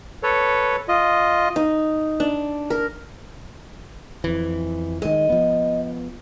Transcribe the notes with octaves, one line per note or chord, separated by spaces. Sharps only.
A4 B4 C#5
F4 D#5
D#4
D4
A#4
F2 E3
D#3 G#3 D#5
F3 B3